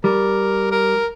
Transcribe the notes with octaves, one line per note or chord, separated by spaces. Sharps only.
G3 A#4
A#4